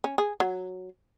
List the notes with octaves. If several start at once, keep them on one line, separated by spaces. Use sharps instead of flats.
C#4
G#4
F#3